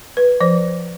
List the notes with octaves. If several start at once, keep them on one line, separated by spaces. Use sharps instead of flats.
B4
F3 C5